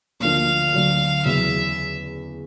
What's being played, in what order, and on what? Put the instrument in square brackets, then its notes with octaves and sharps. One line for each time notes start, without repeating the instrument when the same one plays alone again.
[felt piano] D2 D3 F3 A#3 D4 [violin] F5
[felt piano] D2 D3 F#3
[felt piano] E2 C#3 F#3 [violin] E5